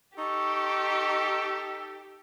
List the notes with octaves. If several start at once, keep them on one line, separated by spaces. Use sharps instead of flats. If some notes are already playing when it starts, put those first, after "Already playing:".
D#4 G4 A4 C#6